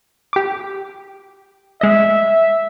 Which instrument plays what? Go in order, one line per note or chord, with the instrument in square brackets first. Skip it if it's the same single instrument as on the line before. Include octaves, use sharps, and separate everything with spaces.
[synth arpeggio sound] G4 D6
[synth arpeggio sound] G#3 D#5 [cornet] E5